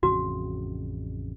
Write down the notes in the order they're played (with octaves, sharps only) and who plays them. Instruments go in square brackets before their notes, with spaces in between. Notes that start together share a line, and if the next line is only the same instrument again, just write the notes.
[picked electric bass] A1 F2 C#3 [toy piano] F#4